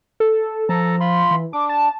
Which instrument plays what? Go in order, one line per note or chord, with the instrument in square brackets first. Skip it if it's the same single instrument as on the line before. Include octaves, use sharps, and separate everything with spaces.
[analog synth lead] A4
[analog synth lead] F3 [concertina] A4 A5 A#5
[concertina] F4 B5 C6
[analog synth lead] E3
[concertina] D4 [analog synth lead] D6
[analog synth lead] A5